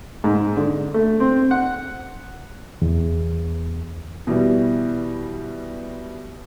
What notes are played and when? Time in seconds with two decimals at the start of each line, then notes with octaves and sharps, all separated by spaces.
0.24 G#2
0.57 D3
0.94 A3
1.20 C4
1.51 F#5
2.82 E2
4.27 B2 E3 G3